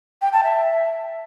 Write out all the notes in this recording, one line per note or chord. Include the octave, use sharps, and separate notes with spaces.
G5
A5
E5